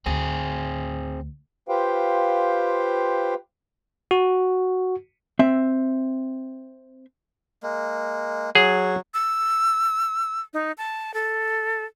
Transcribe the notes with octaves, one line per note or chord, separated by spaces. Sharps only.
D2 C4 G#4
F4 G4 B4 C5 F5 G5
F#4
C4 E5
G#3 A#3
F#3 G#4
E6
D#4
A5
A4